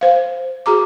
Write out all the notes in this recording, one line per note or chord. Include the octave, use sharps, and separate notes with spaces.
C5 F5
F#4 G#4 A#5 D6